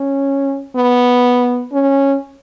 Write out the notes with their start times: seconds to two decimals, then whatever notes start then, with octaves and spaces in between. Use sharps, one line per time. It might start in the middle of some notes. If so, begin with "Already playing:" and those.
Already playing: C#4
0.76 B3
1.72 C#4